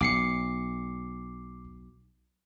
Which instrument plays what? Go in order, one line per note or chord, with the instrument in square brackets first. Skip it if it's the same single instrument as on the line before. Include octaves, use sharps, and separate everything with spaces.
[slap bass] B1 [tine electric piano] D6 C7 C#7